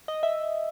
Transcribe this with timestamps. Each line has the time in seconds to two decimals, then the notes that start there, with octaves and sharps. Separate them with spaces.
0.08 D#5
0.23 E5